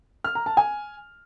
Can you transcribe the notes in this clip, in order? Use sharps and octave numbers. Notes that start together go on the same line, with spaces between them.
F6
A#5
A5
G#5